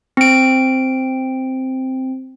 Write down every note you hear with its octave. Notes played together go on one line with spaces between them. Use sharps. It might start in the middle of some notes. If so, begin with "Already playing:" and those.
C4 D7